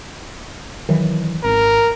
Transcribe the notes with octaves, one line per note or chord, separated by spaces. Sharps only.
D#3 E3 F#3
G#1 A#4